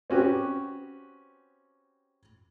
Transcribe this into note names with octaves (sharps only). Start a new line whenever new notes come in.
C4 C#4 F#4 G4 B4